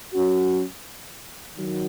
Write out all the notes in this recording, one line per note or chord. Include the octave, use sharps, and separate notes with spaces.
F#3 C#4 F#4
D#3 F#3